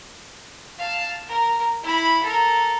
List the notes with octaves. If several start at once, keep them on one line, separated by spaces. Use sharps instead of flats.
F5 A5
A#4
E4 B5
A4 A#4